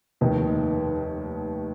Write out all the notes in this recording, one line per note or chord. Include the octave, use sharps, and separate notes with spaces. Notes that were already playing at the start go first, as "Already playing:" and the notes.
F1 D#2 D#3